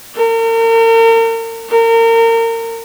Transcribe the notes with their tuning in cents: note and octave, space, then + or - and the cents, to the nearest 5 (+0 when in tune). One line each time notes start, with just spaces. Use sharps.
A#4 -40
A#4 -30